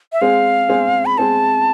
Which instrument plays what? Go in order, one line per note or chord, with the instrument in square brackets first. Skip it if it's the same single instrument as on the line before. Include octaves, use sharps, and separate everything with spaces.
[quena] E5
[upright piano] G#3 C4 G#4 [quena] F5
[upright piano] G#3 C4 G#4
[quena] B5
[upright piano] G#3 C4 G#4 [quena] A5